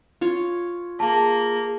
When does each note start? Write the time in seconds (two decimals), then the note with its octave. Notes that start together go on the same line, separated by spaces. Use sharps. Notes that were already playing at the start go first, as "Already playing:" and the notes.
0.21 F4 C#5
1.00 A#3 G#4 A5